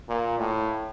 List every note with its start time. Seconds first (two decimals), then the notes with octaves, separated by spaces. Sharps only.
0.08 A#2
0.39 A2